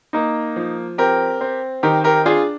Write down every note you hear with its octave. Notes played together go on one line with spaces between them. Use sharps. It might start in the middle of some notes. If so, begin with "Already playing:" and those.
A#3 D#4
F3
C4 G4 A#4
C4
D#3 G4 A#4
G4 A#4
D4 F4 G#4